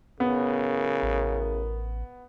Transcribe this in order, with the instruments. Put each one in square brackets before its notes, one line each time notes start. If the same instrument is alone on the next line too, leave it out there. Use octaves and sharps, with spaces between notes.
[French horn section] F#2 A2 A#4 [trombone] C#3 [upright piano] B3
[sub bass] A1